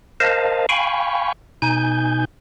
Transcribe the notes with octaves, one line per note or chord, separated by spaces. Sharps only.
A#4 C5 D#5 F5 A5
F5 G5 G#5 B5 C#6
B2 D#4 G#5 G6